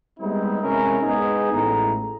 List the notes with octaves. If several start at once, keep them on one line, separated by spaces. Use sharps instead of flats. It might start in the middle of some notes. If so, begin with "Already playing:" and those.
G3 G#3 B3 C4 D#4 E4
C3 G#3 C#4 E4 A#4
G#3 B3 D#4 G#4
A1 A2 G#3 A#5